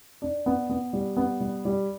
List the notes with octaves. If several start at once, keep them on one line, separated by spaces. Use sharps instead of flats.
D4
B3
B3
G3
B3
G3
G3